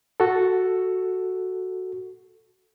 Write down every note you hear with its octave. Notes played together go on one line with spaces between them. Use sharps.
F#4 A4